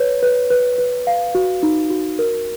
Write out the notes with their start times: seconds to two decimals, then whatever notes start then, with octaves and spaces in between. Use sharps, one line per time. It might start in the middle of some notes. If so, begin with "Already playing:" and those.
Already playing: B4 C#5
0.23 B4
0.50 B4
0.78 B4
1.07 F5
1.35 F#4
1.63 D#4
1.90 F#4
2.19 A#4